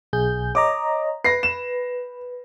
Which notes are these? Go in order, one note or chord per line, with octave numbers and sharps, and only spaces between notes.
B1 G#4 G6
C#5 D#5 A#5 D6
B4 A#6 C7
E7